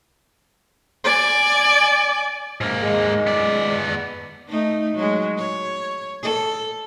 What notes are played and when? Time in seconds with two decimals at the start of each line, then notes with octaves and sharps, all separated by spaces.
1.04 D5 G#5
2.61 G#2 A#3
2.82 G#3
3.27 B3 D5
4.49 A3 D#4
4.95 F#3 G#3
5.38 C#5
6.23 A4